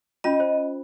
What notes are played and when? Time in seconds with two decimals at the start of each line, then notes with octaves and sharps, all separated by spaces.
0.24 C#4 F4 D#5 B5
0.40 C5